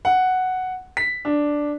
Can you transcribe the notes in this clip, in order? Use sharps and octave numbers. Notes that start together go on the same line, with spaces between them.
F#5
B6
D4